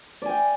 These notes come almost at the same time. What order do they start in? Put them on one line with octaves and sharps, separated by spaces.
D5 G#5 G5